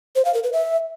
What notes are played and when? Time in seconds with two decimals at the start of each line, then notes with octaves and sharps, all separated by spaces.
0.16 C5
0.25 F5
0.34 A#4
0.44 B4
0.53 E5